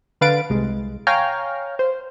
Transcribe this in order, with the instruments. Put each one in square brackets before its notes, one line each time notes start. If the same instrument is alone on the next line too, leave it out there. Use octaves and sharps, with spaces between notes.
[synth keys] D3 B4 F5 A6 D7
C2 G#3
C#5 F5 G5 G#5 A#5 F6
C5